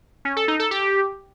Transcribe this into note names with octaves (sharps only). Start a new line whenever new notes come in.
C#4
A4
D#4
A4
G4